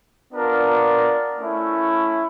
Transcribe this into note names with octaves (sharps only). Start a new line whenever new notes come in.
B3 D4 F4 A#4 D5
A3 C#4 E4